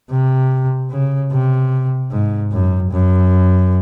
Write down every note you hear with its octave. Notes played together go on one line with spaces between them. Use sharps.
C3
C#3
C3
G#2
F#2
F#2